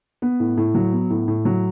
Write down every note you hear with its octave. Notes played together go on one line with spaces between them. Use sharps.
B3
A2
A2
F#3
B3
A2
A2
F#3